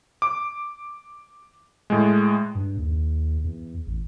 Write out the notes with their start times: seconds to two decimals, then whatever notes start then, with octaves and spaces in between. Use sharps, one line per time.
0.22 D6
1.90 A2 G#3
2.55 G2
2.77 D#2
3.44 E2
3.86 A1